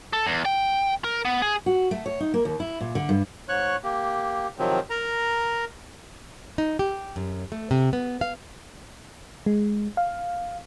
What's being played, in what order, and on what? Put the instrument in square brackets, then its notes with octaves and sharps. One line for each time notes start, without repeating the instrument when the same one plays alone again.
[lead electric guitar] A4
E2
G5
A#4
B3
G#4
[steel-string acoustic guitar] F#4
A3
C#5
D#4
A#3
D#2
E4
A#2
D3
G2
[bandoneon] G#2 C#5 C#6 F#6
A#3 G4
C3 D#3 F3 F#3 C4
A#4 A#5
[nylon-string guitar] D#4
G4
F#2
A3
C3
B3
F5
[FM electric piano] G#3
F5